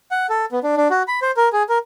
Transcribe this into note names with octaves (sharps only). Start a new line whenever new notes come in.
F#5
A4
B3
D4
D4
F#4
B5
C5
A#4
G#4
A#4